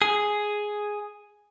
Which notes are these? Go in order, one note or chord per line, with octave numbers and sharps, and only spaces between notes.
G#4